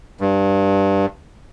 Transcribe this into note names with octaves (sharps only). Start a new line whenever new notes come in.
G2